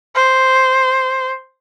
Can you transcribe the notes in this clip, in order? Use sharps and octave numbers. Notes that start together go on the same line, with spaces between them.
C5